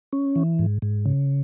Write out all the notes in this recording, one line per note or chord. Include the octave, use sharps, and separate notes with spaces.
C#4
E3
G#2
G#2
C#3